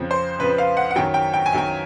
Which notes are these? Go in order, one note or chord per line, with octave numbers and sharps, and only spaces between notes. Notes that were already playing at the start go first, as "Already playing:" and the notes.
Already playing: F2 C#3 F3
C5
F2 C#3 F3 B4
F5
F#5
F#5
F#2 D#3 F#3 G5
G5
G5
G#5
F#2 D#3 F#3 G5